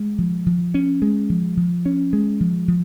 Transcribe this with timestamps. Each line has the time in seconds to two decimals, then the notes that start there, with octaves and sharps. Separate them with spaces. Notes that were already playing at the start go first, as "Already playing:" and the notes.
Already playing: G#3
0.18 F3
0.46 F3
0.74 C#4
1.02 G#3
1.30 F3
1.57 F3
1.86 C#4
2.13 G#3
2.40 F3
2.68 F3